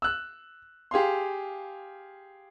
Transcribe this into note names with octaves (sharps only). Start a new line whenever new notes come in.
E6 F#6
G4 G#4 F5 C6